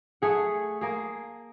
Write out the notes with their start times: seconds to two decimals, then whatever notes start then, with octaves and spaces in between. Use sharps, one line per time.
0.22 A3 G#4 F#5
0.81 A#3 G#4